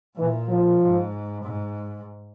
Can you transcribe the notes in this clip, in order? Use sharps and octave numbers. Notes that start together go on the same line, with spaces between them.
A#2 E3
F3
G#2
G#2